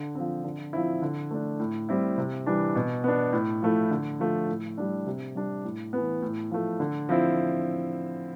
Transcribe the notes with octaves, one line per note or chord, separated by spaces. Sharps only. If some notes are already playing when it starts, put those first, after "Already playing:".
Already playing: D3
F3 C4
D3
F3 C4 E4
D3
A3 D4
A2
G3 C4 E4
C3
E3 G3 D4
B2
B3 D4
A2
F3 A3 E4
D3
F3 A3
A2
G3 D4
C3
G3 D4
A2
E3 B3
A2
F3 A3
D3
F3 C4 E4